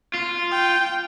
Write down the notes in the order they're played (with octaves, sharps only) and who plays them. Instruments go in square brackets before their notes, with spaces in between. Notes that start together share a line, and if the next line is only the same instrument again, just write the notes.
[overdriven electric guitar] F4
[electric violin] G5